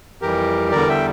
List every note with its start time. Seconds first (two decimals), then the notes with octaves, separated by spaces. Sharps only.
0.22 F2 E3 G3 G4 A#4
0.72 E2 D3 G3 A#4 D5
0.89 E5 G5